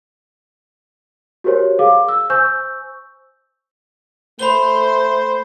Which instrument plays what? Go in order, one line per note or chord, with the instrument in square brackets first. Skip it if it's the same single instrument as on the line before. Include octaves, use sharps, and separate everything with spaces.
[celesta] F#4 G4 A#4 C5 C#5
G#4 F5 D6
E6
C5 G#5 C#6 E6 G6
[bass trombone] A3 [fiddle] C5 [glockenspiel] B5 G7